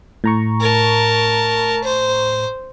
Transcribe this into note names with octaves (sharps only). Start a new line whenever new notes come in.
A2 A#5 C#6
A#4 A5
C5